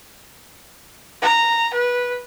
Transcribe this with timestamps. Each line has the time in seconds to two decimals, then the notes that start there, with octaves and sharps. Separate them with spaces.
1.22 A#5
1.74 B4